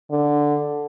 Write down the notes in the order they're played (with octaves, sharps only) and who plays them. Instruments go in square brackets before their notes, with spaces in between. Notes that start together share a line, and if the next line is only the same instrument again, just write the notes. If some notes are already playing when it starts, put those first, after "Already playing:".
[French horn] D3